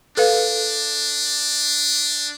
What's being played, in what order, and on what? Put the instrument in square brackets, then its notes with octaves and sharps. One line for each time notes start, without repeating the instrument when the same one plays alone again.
[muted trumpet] D4 [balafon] A4 B4 F5